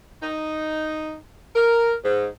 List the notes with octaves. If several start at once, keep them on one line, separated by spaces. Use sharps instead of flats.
D#4
A#4
G#2